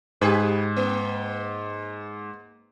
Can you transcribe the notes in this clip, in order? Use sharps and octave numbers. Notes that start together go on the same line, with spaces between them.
G#2 G4 G#4 B4
A#3